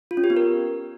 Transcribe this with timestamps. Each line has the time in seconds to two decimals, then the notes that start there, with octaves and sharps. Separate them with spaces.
0.11 F4
0.17 C#4
0.24 G4
0.30 B3
0.36 A#4